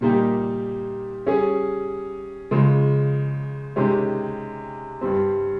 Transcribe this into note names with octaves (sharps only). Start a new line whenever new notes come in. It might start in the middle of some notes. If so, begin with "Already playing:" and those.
A#2 G3 A#3 D#4 G4
G3 C#4 G#4
C#3 F3 G#3
C3 D#3 G#3 C#4 G4
G2 G3 C4